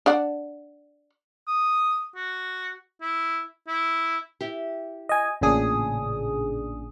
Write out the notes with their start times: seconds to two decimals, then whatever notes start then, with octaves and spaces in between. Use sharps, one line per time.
0.06 D4 D5 F#5
1.47 D#6
2.16 F#4
3.01 E4
3.68 E4
4.41 E4 G4
5.09 D#5 G#5
5.41 A1 A#2 C#3 D4 G#4 D#6